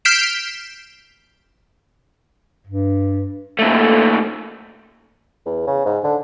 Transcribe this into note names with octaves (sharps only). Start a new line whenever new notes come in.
F6 G6 B6 C7 D7 E7
G2
F#2 A3 A#3
E2
C#3
G#2
D3